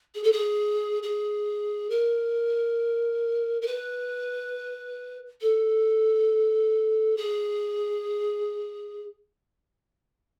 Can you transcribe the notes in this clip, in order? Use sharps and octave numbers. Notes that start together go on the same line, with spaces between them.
G#4
A4
G#4
G#4
A#4
A#4
B4
A4
G#4